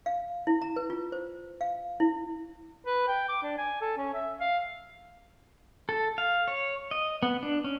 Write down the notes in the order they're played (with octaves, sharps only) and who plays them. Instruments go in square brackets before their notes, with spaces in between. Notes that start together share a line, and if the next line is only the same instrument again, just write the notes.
[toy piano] F5
E4
A#5
B4
F4
C5
F5
E4
[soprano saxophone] B4
G5
D6
D4
G#5
A4
C#4
E5
F5
[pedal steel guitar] A4
F5
C#5
D#5
B3
D4
C#4